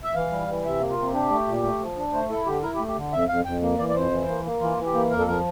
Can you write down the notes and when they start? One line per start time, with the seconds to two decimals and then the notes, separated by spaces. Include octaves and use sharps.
0.03 E5
0.14 E3 F5
0.31 G3
0.48 E3
0.64 C3 E5
0.80 A#3
0.90 F4
0.98 C3
1.13 D4 G4
1.30 A3
1.47 A#2
1.63 A3
1.80 F3
1.97 D4
2.13 A3 C5
2.30 E4 A4
2.46 D3 G4
2.62 E4 A#4
2.75 G4
2.79 A3
2.88 G4
2.96 D3
3.12 F2 E5
3.28 F2 F5
3.45 F2 G5
3.62 A#3
3.78 E3 D5
3.89 D5
3.94 F2 C5
4.11 E3
4.28 A#3
4.44 A#3
4.61 E3 F4
4.77 E3
4.86 G4
4.94 A#3
5.11 F2 A#4
5.19 A4
5.27 F3 A#4